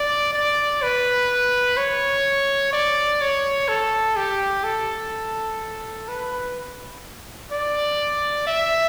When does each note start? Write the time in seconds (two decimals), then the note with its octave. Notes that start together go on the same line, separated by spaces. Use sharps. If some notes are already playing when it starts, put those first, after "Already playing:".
Already playing: D5
0.34 D5
0.82 B4
1.77 C#5
2.73 D5
3.21 C#5
3.69 A4
4.17 G4
4.64 A4
6.09 B4
7.52 D5
8.47 E5